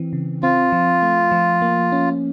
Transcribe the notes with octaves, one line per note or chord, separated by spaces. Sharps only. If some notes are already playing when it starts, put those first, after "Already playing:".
Already playing: E3 C4
C#3
C4 F4
F3
A3
F3
A#3
C#4